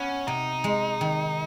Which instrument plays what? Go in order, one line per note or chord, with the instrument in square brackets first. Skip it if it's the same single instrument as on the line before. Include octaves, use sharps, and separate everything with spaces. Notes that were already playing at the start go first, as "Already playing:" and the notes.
Already playing: [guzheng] B3 [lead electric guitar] C#4
[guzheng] C3 [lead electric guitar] D#4
[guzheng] G#3
D#3